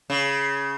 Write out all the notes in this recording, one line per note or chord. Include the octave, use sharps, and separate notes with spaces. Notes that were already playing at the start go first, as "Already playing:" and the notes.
C#3